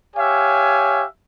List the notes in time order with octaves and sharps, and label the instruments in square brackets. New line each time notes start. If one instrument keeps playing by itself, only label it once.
[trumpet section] G4 C#5 E5 F5 G#5